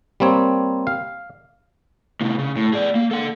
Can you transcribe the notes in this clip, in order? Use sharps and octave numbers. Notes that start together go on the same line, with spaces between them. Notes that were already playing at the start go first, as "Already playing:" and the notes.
G3 A#3 C4 C#5
F5
A2 C3
C#3
A2
G#4 D5
A#3
A4 F#5